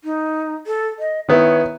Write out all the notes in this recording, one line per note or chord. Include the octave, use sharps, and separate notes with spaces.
D#4
A4
D#5
D#3 B3 E4 C#5